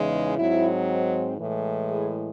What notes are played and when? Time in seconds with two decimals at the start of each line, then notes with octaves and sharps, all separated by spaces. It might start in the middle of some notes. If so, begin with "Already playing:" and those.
Already playing: E2 C#3 E3 G#3 D#4
0.36 G#2 F#3 C4 D#4 E4
1.38 A2 E3 G#3
1.89 G#4